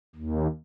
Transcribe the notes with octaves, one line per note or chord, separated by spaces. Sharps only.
D#2